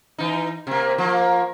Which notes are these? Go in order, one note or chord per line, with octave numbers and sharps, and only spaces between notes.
E3 D#4
C3 A#3
F3 A#3